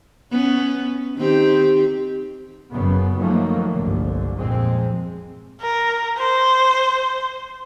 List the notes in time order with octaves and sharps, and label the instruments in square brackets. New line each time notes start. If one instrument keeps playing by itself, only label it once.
[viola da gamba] B3 C#4
D#3 C4 G4
[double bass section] F#1 F#2 C#3 B3
D#3 F3 F#3 A3 A#3
G1 C2 D3
F2 A#2 G#3 C4
[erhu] A#4
C5